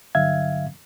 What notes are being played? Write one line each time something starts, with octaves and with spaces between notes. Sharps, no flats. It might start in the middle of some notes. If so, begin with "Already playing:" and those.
G2 D3 F#3 E5 F5 G#6